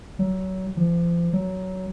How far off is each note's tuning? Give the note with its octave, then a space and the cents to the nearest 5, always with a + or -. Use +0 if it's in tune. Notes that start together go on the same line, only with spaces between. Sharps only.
F#3 +25
F3 -35
F#3 +15